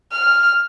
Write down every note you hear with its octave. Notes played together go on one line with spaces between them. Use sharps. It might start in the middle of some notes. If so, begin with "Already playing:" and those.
F6